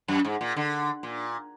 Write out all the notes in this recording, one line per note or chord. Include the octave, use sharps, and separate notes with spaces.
F#2
G#2
A#2
D3
A#2